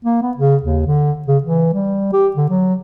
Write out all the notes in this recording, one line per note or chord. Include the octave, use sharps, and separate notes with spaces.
A#3
B3
C#3
D#2
D3
C#3
E3
G3
G4
D3
F#3